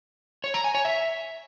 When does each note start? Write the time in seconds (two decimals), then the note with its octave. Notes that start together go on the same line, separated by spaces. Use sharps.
0.44 C#5
0.54 A#5
0.64 G#5
0.75 C#5
0.85 E5